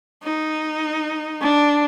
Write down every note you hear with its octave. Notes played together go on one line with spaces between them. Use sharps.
D#4
D4